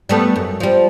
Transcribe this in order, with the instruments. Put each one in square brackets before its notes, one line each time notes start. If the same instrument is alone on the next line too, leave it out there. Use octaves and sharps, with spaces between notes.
[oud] G3 A3 B3
F#2
F3 G3